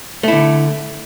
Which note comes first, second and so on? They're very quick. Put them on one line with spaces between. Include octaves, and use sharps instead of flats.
A3 E4 D3